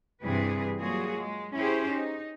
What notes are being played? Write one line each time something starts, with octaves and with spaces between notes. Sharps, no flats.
G2 C3 E3 G3 G#4 B4
F#3 G3 A#3 F4 F#4 G#4
G#3
C#4 E4 G4 G#4 C5
D#4